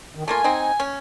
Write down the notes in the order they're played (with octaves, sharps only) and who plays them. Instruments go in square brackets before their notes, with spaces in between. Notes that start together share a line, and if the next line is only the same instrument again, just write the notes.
[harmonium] D#3
[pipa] A3 A#3 F4 [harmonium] G#5
[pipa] C4 D#4
C#4